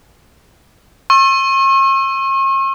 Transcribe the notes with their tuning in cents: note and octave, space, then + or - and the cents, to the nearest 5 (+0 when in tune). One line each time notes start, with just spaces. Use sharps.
C#6 -45 E6 +15